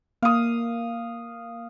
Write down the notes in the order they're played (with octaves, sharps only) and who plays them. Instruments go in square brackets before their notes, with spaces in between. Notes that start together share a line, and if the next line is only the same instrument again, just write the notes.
[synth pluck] A#3 [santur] F5 D#6